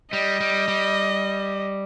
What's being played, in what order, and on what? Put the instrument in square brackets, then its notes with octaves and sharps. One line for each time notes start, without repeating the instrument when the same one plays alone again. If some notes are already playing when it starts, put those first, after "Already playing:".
[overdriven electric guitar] G3 [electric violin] D#5
[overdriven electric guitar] G3
G3